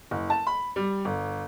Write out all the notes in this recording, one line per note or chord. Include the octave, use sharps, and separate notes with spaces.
F#1
A5
B5
G3
G1